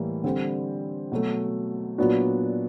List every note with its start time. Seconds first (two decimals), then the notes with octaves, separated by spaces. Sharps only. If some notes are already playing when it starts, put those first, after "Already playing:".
Already playing: A2 E3 G3 A#3
0.24 D3 G3 C4
1.12 B2 F#3 A3
1.98 A#2 F#3 B3 D4 F#4